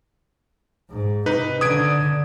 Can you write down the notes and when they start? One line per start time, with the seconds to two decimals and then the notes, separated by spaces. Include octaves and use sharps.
0.90 G#2
1.26 C3 D#4 B4
1.61 D3 D#6 G#6 D7